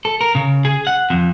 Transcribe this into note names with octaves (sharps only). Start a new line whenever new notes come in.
A4
A#4
C#3
G#4
F#5
F2